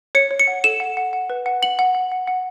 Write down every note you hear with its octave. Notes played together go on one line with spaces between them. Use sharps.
C#5 C#7
C#5
C#7
F#5
A4 E7
F#5
F#5
F#5
B4
F#5
F#5 F#7
F#5
F#5
F#5
F#5